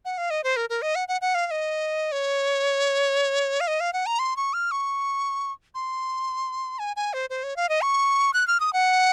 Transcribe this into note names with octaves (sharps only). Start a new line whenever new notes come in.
F#5
F5
D#5
C5
A#4
A#4
D#5
F#5
F#5
F#5
F5
F5
D#5
C#5
F5
D#5
F5
F#5
A#5
C6
C#6
F6
C#6
C6
G#5
G#5
C5
C5
C#5
F5
D#5
C#6
F#6
F6
D#6
F#5